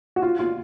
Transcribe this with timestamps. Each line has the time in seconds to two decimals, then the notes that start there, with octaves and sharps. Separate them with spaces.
0.16 F#4
0.22 F4
0.39 F4